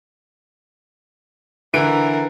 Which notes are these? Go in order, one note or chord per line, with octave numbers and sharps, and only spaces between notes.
D3 E3 A#4 D7